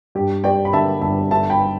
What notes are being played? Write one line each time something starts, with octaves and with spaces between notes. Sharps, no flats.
G2 G4
G3 D5 G5
B5
D3 E5 A5
G1 E5 A5
D3 E5 A5
G5 B5